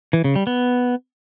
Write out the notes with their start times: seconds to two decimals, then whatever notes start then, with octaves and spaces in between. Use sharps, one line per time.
0.13 E3
0.24 C#3
0.36 G3
0.47 B3